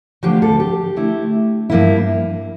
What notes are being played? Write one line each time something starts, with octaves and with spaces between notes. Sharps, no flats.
D2 D3 F3 G4
A4
G4
D3 A3 E4
G2 F3 A#3 E4